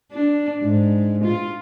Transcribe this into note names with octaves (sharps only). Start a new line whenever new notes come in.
D4
G#2
F4